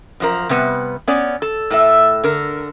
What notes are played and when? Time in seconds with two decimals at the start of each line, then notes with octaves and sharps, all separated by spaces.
0.20 F#2 F3 A#4
0.49 C3 G3 B3
1.07 B3 C#4 D5
1.42 A4
1.70 A2 A4 E5
2.24 D3 A#4